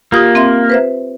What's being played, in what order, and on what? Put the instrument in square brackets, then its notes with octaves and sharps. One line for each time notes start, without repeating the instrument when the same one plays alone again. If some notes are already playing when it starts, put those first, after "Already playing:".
[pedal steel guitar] A#3 [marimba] F4 G4 D#6
[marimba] C4 E5 C6
B4 C5 E5